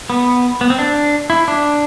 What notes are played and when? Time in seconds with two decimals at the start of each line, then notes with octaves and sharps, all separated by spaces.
0.10 B3
0.61 B3
0.70 C4
0.79 D4
1.30 E4
1.48 D4